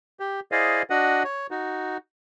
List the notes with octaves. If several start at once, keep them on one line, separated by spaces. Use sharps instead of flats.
G4
E4 G#4 C5 D5 D#5 F5
D4 F#4 D#5 F#5
C#5
D#4 F#4